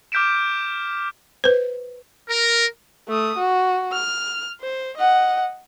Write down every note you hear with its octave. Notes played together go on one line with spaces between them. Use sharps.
D6 F6 G6 B6 D7 E7
B4 C5
A#4
A3 D#6
F#4
F6
C5
D#5 F#5